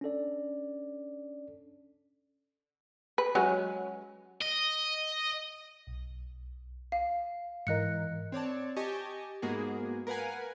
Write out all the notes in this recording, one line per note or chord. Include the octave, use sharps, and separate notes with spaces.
C#4 D4 A4 D5
B4
F#3 G#3 C#4
D#5
B1
F5
G#2 E3 A#4 D#5 F#6 C#7
C4 C#5 D5 A5
G4 D#5 G#5 A5 C#6
G#2 G#3 A#3 B3 F#4 G#4
A#4 B4 F5 F#5 G#5